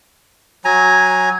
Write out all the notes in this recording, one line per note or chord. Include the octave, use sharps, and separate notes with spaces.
F#3 G#5 A#5